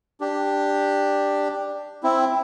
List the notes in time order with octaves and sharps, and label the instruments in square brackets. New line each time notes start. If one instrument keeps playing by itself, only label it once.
[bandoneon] D4 G4
C4 E4